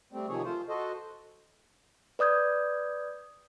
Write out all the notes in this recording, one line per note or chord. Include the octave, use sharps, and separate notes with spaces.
G3 A3 C4
C3 D#3 F3 G#4 C#5
A3 F4 C5
F#4 A4 C5 D#5
B4 D5 D#6 G6 G#6